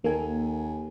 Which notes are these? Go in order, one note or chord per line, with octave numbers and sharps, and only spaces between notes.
D#2 A#3 A4 G#5